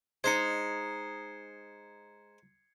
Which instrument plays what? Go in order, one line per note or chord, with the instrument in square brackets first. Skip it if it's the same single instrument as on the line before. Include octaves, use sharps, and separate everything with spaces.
[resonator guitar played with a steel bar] G#3 D#4 [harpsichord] C5 [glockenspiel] G#6 C7 C#7